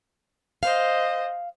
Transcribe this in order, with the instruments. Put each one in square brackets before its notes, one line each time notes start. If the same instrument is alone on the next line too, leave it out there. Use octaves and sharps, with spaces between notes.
[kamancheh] C5 D#5 [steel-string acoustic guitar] F5